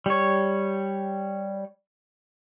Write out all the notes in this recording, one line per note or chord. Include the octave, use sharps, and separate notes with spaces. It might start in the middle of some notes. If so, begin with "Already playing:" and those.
G3 C#5